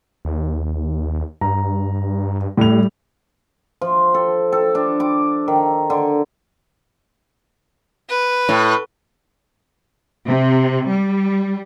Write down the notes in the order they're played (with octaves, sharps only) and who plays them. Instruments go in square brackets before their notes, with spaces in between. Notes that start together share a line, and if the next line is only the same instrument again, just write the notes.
[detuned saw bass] D#2
[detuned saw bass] G2 [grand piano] A#5
[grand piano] A2 F7 [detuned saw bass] G3
[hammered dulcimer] F3
A4
A4
D4
D6
D#3
D3
[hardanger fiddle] B4
[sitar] A2
[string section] C3
G3